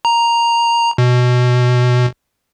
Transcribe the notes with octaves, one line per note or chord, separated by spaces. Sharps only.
A#5
B2